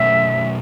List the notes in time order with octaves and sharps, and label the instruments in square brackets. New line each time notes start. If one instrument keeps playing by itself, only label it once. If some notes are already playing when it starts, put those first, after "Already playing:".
Already playing: [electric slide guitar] B2 F#3 A3 C#4 [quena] E5